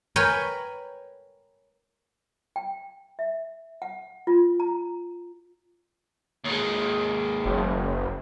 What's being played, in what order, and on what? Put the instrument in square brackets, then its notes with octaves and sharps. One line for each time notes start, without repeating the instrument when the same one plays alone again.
[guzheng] A#4 B4 C#5 G5 G#5 B5
[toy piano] G5
E5
F#5
F4
A#5
[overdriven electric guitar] D#2 G#3
[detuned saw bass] F#1